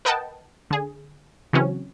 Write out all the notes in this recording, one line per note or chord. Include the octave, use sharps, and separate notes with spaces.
A#4 B4 D#5 F#5 G5 A5
D3 G#4
C#3 E3 F#3 C4 C#4